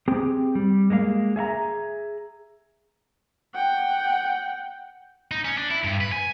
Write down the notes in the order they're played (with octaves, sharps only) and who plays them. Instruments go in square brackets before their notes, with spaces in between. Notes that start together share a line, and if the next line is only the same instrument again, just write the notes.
[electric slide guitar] C4 G4 G#4 G5
G3
G#3 A#3 D4 F5
G#4 E5 F#5 A#5
[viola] F#5 G5
[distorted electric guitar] D#4
C#4
D4
E4
G2
B4
G#5